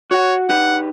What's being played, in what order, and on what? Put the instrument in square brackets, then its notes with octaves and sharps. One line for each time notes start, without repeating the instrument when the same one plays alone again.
[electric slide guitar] F#4 F#5 [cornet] C#5
[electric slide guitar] D#4 G4 B4 [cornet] F#5